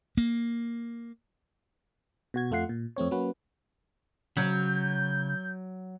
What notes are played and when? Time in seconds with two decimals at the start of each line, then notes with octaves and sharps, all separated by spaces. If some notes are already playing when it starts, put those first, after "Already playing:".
0.17 A#3
2.34 B2 F#4 G#6
2.51 F2 A3 F4 F#5 C7
2.69 A#2
2.96 F2 A3 C4 C#5
3.11 F#3 A#3 C#4 F#4 B4
4.37 C#3 F#3 G6